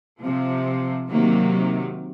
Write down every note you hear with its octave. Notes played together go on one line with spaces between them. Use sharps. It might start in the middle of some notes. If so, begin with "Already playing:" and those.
C3 F3
C3 D#3 F#3 A#3